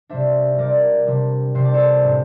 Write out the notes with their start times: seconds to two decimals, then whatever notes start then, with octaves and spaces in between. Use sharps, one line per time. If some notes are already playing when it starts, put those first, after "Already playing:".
0.09 C3 G3 D4 C5 E5
0.57 C3 G3 D4 A#4 D5
1.06 C3 G3 D4
1.55 C3 G3 D4 C5
1.65 D5
1.74 A4 C5
2.04 A2 G3 C4